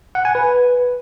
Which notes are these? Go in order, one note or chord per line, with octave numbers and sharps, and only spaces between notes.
F#5
G#5
B4